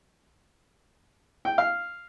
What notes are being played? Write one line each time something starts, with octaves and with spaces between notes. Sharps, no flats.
G5
F5